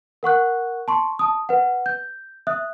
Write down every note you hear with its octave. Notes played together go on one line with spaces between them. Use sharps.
A#4 F#5 C#6 F#6
A5 C6 C#6
A5 D#6
B4 F#5
G6
E5 D#6 F#6